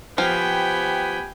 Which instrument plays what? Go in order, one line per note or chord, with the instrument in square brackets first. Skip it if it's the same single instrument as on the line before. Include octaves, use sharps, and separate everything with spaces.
[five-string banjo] F3 F5 [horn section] B3 G4 G#5 [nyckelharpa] G5 B5